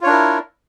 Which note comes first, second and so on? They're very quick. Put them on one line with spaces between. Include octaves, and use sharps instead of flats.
F4 C#5 D4 A#4 E4